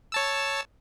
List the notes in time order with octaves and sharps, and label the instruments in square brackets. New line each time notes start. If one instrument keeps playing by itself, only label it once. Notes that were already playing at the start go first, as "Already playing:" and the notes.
[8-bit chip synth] C#5 A5 E6